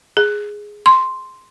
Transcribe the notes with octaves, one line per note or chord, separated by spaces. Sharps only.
G#4
C6